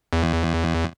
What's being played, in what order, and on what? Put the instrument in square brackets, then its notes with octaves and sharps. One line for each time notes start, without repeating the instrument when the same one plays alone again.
[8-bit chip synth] E2